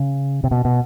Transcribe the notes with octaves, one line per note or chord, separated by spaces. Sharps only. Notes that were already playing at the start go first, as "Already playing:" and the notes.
Already playing: C#3
C3
B2
B2